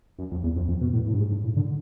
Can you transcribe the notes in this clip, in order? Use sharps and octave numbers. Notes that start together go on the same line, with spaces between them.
F#2
F2
E2
F2
F2
B2
A2
A2
G2
G#2
G2
A2
D3